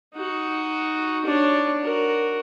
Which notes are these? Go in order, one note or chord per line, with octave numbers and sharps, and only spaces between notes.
D#4 F#4
D4 C#5
F#4 A#4